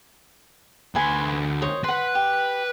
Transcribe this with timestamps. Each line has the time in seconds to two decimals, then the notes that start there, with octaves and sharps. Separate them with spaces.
0.95 D2 B4 G#5 C6
1.62 C5 C#5 D#5
1.84 B4 F#5 C6
2.15 G4